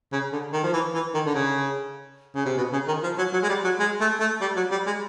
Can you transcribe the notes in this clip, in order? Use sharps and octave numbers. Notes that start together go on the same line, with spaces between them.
C#3
D3
D#3
F3
E3
E3
D#3
D3
C#3
C#3
C3
B2
C#3
D#3
F3
F#3
F#3
G#3
G3
F#3
G#3
A3
A3
G3
F#3
G3
G#3